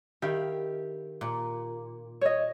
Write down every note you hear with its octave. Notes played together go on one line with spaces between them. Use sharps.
D#3 E4 G4 F5
A#2
C#5 D#5